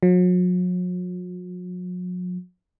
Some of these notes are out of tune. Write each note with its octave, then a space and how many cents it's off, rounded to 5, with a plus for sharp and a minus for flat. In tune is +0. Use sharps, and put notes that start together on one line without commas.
F#3 -45